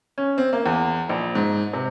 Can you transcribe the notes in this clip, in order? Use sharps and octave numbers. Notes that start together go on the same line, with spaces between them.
C#4
C4
A#3
E2
A#1
G#2
C3